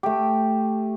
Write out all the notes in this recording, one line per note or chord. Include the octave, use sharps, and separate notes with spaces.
A3 G4